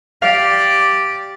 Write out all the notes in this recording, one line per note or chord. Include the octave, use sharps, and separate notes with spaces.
G4 D5 F5